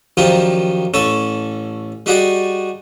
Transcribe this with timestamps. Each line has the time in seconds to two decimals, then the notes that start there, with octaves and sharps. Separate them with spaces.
0.17 F#2 D#3 F3 G3 D#4 F4
0.94 A1 C#4 A4 C#5 A5
2.06 G3 D#4 F#4 G#4 D5